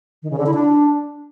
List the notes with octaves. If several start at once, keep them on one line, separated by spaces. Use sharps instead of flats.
D#3
C#3
D3
E4
D4